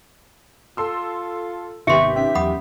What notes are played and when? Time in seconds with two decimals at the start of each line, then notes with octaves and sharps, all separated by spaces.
0.77 F4 A4 C6 E6
1.87 G#1 C3 D#3 B3 G4 E5 C6 C#6
2.16 C#4 E5
2.35 E2 F#3 F#5 B5 D#6